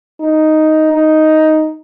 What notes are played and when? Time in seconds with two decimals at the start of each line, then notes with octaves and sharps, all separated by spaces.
0.20 D#4
0.92 D#4